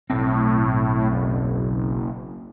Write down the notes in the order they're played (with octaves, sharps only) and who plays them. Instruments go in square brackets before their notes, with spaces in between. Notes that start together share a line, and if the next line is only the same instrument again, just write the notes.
[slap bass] B1 C4 [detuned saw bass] A2
[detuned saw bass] F#1